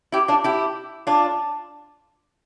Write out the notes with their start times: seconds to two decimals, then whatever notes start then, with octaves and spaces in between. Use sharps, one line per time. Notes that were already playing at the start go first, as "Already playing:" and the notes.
0.12 E4 G4
0.28 D4 F4
0.44 E4 G4
1.07 D4 F4